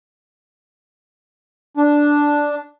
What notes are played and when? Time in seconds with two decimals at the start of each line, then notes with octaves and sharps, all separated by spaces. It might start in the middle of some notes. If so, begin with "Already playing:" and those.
1.77 D4